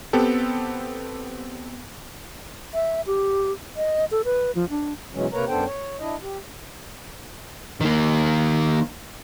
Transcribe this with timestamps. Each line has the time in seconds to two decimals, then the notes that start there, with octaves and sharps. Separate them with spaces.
0.13 B3 C4 G4 A4
2.74 E5
3.07 G4
3.76 D#5
4.11 A4
4.25 B4
4.55 F3
4.70 D4
5.13 B2 E3 F#3 G#3 C#4
5.33 C3 A#3 A#4 B4 C#5 A#5
5.48 F#2 B3 D4 A4 C5 G5
5.65 C#5
6.00 D4 E4 D#5
6.22 G4
7.81 D#3 A#3